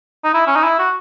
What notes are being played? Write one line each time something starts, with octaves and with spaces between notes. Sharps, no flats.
D#4
E4
C#4
D#4
E4
F#4